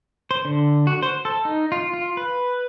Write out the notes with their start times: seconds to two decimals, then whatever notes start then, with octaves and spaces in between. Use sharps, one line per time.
0.31 C5
0.45 D3
0.87 F#4
1.03 C5
1.25 A4
1.45 D#4
1.72 F4
1.94 F4
2.17 B4